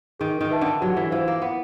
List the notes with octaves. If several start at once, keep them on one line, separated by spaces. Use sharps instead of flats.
D#3 G#4
D#3
B4 E5 A5
D3
F#3 G4
E3
E3 C5 F5
A#3
B3 E4